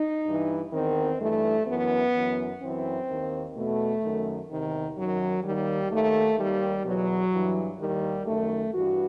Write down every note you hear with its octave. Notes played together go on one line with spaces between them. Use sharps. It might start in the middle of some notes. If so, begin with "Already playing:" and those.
Already playing: D#4
G2 E3
E2 D#3 C4
G2 E3 A3
F#2 E3 B3
F#2 E3
F#2 E3 C4
D#2 D#3
E2 B2 A3
F#2 D#3
E2 C3 D#3
F#2 D#3 F#3
D#2 D#3 G3
D#2 D#3 A3
D#2 D#3 G3
E2 B2 F#3
G2 E3
D#2 D#3 G3
F#2 D#3 A3
G2 E3 F#4